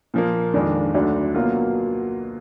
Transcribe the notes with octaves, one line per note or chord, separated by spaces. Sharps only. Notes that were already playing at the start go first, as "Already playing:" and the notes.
A#2 F3 A#3
F2 D#3 G#3 D4 F4
D2 D3 F#3 D4
B2 F#3 A#3 F4